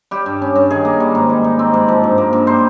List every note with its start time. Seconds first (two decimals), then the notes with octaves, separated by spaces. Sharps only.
0.11 G3 G4
0.26 G2
0.42 C#4
0.56 G2
0.70 D#3 G#4
0.85 A#3
1.00 G3
1.15 G#2
1.29 G3
1.44 D#4
1.59 C4
1.74 G#2
1.88 F3
2.04 G2
2.18 A#3
2.33 G2
2.47 G3 C5